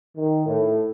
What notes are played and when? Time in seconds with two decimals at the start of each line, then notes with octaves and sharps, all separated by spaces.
0.16 D#3
0.47 A2